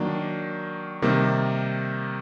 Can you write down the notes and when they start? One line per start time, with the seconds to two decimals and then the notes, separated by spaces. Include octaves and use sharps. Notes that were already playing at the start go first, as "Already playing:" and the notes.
Already playing: D#3 F#3 A#3 D4
1.02 C3 D#3 G3 A#3